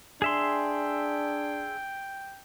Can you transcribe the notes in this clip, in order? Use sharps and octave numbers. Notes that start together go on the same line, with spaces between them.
D4 G#4 E5 G5 C6